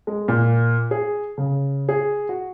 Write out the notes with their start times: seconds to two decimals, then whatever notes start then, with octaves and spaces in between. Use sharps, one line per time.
0.07 G#3
0.28 A#2
0.91 G#4
1.38 C#3
1.89 G#4
2.29 F#4